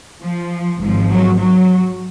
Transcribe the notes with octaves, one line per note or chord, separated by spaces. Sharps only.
F3
G#1 G#2 F3
F#3
F#3